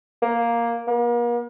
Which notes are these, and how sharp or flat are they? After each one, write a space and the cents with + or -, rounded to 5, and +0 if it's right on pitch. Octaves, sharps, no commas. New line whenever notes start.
A#3 +5
A#3 +40